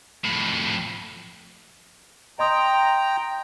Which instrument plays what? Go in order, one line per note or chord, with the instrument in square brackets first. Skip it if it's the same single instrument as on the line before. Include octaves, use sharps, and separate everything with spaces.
[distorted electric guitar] F2 A2
[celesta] D#5 C6 D#6 [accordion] G5 A#5